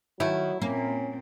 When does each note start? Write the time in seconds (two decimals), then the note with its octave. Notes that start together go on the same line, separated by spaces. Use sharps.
0.20 B2 D#3 F#3 A3 E4
0.62 A#2 A#3 C4 C#4